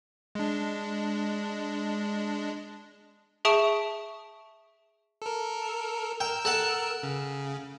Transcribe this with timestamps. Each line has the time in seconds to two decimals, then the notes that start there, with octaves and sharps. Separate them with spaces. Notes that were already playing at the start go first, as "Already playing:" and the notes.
0.35 G#3 D4
3.45 G#4 E5 A5 C#6 D#6 D7
5.22 A4 A#4
6.20 A#4 G5 E6
6.45 A4 F#5 A5
7.03 C#3